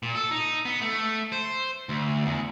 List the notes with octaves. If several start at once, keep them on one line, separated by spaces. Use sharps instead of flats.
A#2
A4
D#4
B3
A3
C5
D2
E2